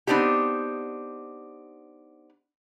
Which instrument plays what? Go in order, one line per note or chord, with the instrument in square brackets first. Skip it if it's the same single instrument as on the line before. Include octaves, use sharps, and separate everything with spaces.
[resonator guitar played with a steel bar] B3 C4 D4 D#4 G4